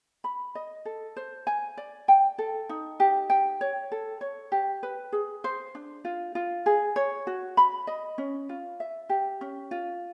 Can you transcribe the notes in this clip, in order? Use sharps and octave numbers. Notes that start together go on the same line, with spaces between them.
B5
D#5
A4
C5
G#5
D5
G5
A4
D#4
G4
G5
C#5
A4
C#5
G4
B4
G#4
C5
D4
F4
F4
G#4
C#5
F#4
B5
D#5
C#4
F4
E5
G4
C#4
F4